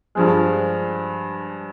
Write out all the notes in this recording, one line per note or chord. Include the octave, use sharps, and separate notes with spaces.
G2 F3 G#3